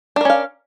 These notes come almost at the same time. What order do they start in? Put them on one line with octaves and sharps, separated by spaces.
D4 A#4 C#4 F5